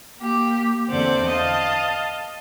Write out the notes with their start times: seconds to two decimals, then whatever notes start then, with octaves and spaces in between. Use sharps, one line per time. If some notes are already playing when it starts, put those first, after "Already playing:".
0.18 A#3 G4
0.90 E2 D3 C4 D5 F#5
1.28 D#5 F5 A5